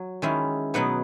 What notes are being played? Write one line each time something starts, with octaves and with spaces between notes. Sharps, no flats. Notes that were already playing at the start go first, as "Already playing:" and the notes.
Already playing: F#3
D#3 G#3 C#4 E4
B2 F#3 B3 D#4 F#5